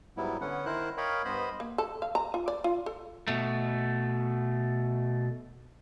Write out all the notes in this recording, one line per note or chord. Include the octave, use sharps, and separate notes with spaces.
G#2 F#3 G3 B3 E4
D3 B3 C#4 F#5
D#3 E4 A#4 C5 F#6
A#4 C#5 D#5 F5 G5 B5
G2 B3 C5 D#5 B5
A#3
A4
F5
A#5
F4
D5
F4
A4
B2 A3